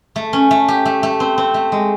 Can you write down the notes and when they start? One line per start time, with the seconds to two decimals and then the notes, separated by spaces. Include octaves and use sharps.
0.16 A3
0.33 C#4
0.51 A3
0.68 G4
0.85 A3
1.03 A3
1.20 C4
1.38 C4
1.54 A3
1.72 G#3